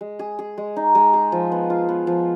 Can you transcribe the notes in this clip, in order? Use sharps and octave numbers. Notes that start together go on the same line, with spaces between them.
G#3
G#4
G#4
G#3
D#4
G#3
G#4
F3
B3
F4
B3
F3